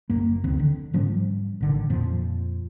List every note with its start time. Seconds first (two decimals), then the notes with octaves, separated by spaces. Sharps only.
0.10 F#1 F#2 A#3
0.44 F1 D2 D#3 C4
0.59 D3
0.94 G#2 F3 G3 C#4
1.61 A1 D3 D#3
1.90 F2 A#2 F3